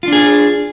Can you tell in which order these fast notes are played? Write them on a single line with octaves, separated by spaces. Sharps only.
F4 D4 G#4